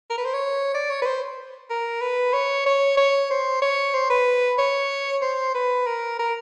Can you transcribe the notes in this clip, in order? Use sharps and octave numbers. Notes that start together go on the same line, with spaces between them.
A#4
B4
C5
C#5
D5
C#5
B4
C5
A#4
B4
C#5
C#5
C#5
C5
C#5
C5
B4
C#5
C5
B4
A#4
A#4